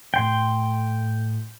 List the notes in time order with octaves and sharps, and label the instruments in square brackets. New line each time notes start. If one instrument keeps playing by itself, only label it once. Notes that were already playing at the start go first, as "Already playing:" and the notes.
[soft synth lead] A2 [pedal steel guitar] G5 C6